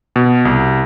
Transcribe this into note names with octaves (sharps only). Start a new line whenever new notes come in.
B2
C2